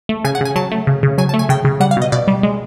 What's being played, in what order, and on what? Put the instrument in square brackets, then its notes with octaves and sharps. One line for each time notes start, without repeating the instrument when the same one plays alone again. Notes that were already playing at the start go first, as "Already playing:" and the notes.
[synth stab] A3
C#3 G#5
F#5
C#3 G#5
F#3 A5
A3
C#3
C#3
F#3 G#5
A5
A3
G#5
C#3 G5
C#3
G3 F#5
F5
B2 D#5
B2 D5
G3
G#3